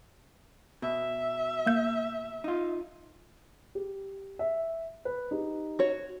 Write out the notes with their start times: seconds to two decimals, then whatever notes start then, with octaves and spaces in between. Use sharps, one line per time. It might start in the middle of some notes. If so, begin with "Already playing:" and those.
0.82 B2 E5
1.66 A#3 G6
2.44 D#4 F4
3.75 G4
4.39 E5
5.05 B4
5.31 D#4 G4
5.79 F#4 C#5